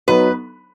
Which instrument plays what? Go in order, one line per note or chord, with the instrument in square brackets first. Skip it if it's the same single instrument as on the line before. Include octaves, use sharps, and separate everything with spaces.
[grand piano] F#3 B3 D#4 [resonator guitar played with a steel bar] B4